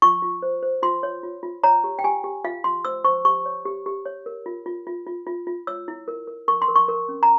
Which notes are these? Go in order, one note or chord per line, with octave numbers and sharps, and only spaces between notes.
F4 C#6
F4
C5
C5
F4 C6
C#5
F4
F4
C#5 A#5
G4
G5
G4 G#5
G4
F4 F5
F4 C6
C5 E6
C5 C#6
G4 C#6
C#5
G4
G4
C#5
A#4
F4
F4
F4
F4
F4
F4
C#5 E6
E4
A#4
A#4
A#4 C#6
C6
A#4
C#6
A#4
C#4
A#5